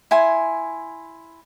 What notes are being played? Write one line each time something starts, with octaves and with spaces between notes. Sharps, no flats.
E4 G#5 C6